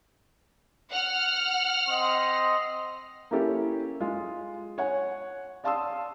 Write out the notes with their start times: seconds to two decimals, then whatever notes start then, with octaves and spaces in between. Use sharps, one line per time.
0.92 F#5 F6
1.89 C4 D#5 C6
3.31 A#3 C#4 E4 G4 A4
4.00 G#3 F4
4.78 C#5 F#5 G#5
5.64 D5 F5 A5 C6 D#6 E6